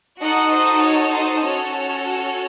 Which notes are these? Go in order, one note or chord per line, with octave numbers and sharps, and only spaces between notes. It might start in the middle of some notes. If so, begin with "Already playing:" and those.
D#4 F#4 A4 D#5 F#5
C5 D#5
C#5
C5 D#5
C#4 F#4 A4 C#5
C#5
C#5